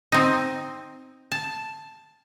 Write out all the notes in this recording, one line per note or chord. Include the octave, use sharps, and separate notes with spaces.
C4 D#4
A5